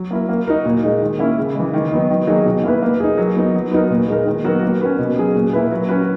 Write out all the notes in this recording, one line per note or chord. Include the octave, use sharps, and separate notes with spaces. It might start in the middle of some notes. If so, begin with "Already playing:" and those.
Already playing: F#3
A#3 E4 A#4
A#3
D#4 F#4 A#4
A#2
G#3 D#4
D#3
A#3 C#4 E4
C#3
E3 G#3
D#3
F#3 B3 D#4
D#3
F#3 A#3 D#4 G#4
B2
A#3 E4 B4
A#3
D#4 G#4
F#3
B3 D#4
F#3
B3 D#4 F#4 A#4
A#2
G#3 D#4 A#4
D#3
F#3 B3 F#4 A#4
A#3
C#4 F#4 B4
B2
F#3 C#4 G#4
A#2
A#3 E4 B4
F#3
C#4 F#4 B4